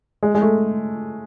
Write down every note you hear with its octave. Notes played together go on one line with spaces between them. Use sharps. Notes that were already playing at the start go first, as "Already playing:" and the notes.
G#3
G#3
A3